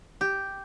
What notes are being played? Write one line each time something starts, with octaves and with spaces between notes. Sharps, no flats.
G4